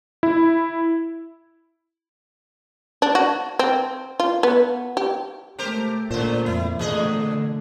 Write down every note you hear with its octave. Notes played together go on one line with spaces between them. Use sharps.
E4
D4
F#4
C4
F4
B3
G4
A3 G4 A#4 C5
A#2 C#3 C5
F2 E4
E2 D3 A3 G#4 D#5